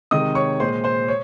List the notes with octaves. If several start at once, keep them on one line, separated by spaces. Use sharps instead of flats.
C3 D#3 G#3 D#5 D#6
C#5 C#6
A#2 G#3 C5 C6
C5 C6
C#5